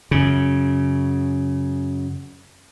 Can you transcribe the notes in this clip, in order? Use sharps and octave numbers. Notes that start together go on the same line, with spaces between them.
F#2 C#3